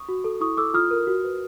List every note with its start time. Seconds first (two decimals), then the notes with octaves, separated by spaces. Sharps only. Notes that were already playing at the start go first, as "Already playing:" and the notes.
Already playing: C#6 D#6
0.09 F#4
0.24 A4
0.40 E4 C#6 D#6
0.57 A4 D6 E6
0.74 F4 D#6 F6
0.91 A#4
1.07 F#4
1.24 B4